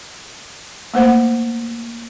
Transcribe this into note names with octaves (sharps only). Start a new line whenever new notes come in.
A3 A#3 C5 F#5